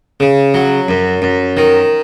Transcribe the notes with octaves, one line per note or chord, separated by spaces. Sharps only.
C#3
F#3
F#2
F#2
D#3